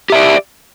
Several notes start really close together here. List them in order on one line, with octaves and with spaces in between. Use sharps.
G4 E5 D5